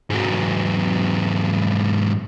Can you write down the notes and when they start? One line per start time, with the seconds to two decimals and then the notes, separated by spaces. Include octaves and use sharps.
0.10 G#2 F#3